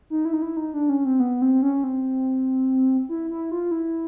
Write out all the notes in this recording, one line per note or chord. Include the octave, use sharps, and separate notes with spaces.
D#4
E4
D#4
E4
D#4
D4
C#4
C4
B3
C4
C#4
C4
E4
E4
F4
E4